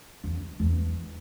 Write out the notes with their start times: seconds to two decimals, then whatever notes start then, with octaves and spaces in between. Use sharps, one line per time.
0.24 E2
0.60 E2